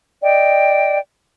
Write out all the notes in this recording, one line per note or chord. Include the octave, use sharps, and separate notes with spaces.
D5 D#5 G5